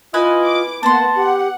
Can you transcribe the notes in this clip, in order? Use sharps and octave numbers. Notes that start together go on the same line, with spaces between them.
E4 F4 B4 D#5 G#5
D6
A#3 B3 C5 F#5 A5 C6
G4 F#5